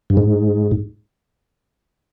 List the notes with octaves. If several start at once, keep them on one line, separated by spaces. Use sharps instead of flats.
G2
G#2